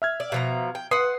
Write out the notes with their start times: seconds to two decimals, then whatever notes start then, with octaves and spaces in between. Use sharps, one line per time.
0.02 E5 F6 G#6
0.20 D5
0.32 B2 F3 A#5
0.75 G5
0.91 B4 F#5 C6 D#6 C7